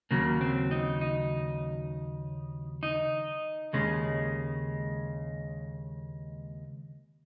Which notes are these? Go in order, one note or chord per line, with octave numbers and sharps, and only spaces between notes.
D#2 C#3 F#3 A#3
C4
D#4
D#4
D#4
D#2 C#3 G#3